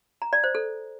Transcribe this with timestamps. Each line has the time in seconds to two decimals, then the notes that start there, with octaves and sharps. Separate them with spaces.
0.22 A#5
0.33 D5
0.44 C5
0.55 A4